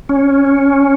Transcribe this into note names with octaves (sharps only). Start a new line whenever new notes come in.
C#4